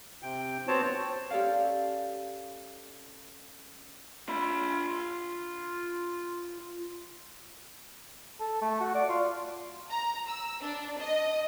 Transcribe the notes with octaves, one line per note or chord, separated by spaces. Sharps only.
C3 G5
B3 C4 F#4 C5 C#5 A5
C#4 G4 A4 D5 F5
F4 B5
A4
A3
F#4
D5
F4
A#5
E6
D4
D#5